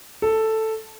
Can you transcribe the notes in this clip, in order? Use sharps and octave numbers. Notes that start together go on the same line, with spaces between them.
A4